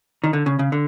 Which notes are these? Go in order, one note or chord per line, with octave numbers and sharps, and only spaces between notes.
D#3
D3
C#3
C#3
D3